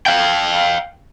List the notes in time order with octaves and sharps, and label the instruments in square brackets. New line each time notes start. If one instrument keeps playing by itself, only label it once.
[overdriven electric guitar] F5 G5